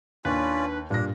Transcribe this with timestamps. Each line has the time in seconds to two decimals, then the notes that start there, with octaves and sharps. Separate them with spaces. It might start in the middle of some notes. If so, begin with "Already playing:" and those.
0.25 D#2 C#4 D4 F4 B4 D5
0.90 G2 A#2 D4 A#6